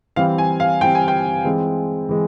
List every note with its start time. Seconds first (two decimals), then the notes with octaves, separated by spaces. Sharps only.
0.16 E3 G3 C4 F5
0.38 G#5
0.60 F5
0.81 E3 G3 C4 G5
0.95 G#5
1.08 G5
1.45 E3 G#3 C4
2.09 E3 G#3